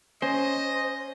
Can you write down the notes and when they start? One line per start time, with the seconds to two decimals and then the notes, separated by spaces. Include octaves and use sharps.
0.22 C#4 C5 D#5